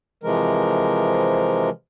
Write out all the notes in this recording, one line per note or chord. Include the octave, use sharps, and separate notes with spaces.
C3 E3 F3 G#3 A#4